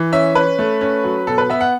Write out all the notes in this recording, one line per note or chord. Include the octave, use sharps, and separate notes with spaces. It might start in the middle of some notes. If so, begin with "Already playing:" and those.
Already playing: E3
C#4 E5
C#4 B4
A3
C#4
F#3
B2 A4
B4
B3 E5
F#5